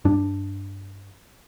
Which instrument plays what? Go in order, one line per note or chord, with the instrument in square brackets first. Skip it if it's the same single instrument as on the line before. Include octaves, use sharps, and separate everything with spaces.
[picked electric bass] G2 D4